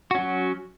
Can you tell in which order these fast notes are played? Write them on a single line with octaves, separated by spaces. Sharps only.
F#4 C#4 F#3